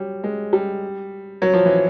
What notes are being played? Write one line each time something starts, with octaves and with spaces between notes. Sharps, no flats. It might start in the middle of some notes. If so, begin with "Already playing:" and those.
Already playing: F#3 G3
G#3
G3
F#3
F3
E3